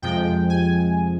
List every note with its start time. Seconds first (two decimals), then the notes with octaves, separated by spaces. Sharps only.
0.02 F2 C3 F3 G#3 G5
0.50 G#5